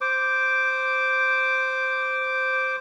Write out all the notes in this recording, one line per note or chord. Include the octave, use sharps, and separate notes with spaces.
C5 D6